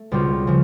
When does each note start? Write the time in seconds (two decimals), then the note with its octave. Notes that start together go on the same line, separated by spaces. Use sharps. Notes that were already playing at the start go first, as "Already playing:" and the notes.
Already playing: A3
0.11 C#2 B2 G3 C4 F4
0.47 C#3 F3